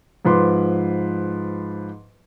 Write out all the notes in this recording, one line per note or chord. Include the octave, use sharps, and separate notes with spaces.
G#2 F3 B4 C6 D6